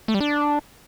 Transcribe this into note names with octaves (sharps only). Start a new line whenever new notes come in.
A3
G3
D4